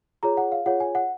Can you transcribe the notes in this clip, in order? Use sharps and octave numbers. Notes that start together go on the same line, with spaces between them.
F4 G#4 C#5 A#5
F#5
F5
F4 G#4 C#5 F#5
G#5
F#5